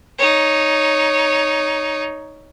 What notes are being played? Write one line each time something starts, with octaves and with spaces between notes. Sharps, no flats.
D#4 C#5